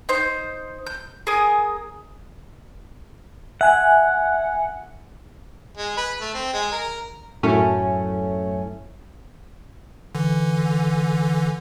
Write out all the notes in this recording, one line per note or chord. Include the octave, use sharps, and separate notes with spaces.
D#4 C5 G6
G6
G#4 A#4 G#5 D#6
E5 F#5 G#5
G#3
B4
A3
C4
G#3
A#4
F#2 A2 A3 C#4
D3 E3